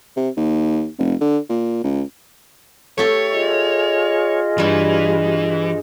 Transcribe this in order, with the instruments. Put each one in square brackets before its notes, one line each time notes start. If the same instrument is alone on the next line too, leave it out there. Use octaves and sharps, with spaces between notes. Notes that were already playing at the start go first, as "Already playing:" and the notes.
[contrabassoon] C3
D#2
F1
D3
A#2
C#2
[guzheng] A3 G4 A4 [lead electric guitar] C#5
[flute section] F4 G#4 D#5
[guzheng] G2 G3 [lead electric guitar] E3